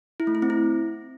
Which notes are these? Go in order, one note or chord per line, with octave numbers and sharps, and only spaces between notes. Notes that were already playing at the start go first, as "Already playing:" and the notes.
E4
A3
E4
C4
E4